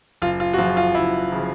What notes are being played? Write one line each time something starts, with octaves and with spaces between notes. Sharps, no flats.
F#1 F4
F4
F#4
F#2 C#3 F3 F4
F4
F#1 E4
C#3 F3